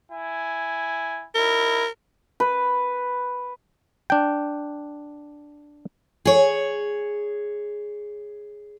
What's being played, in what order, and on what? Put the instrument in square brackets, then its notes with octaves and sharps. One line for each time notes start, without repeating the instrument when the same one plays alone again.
[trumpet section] E4 G#5
[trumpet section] D#4 E4 [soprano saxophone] A#4
[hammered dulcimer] B4
[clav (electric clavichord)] D4 G5
[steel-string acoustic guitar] G#4 C#5